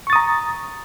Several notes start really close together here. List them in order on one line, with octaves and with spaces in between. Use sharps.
C#6 A6 D#6 A#5